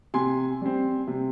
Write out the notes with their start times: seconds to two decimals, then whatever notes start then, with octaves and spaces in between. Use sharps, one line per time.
0.14 C3 G#5 C6
0.61 G3 C4
1.07 C3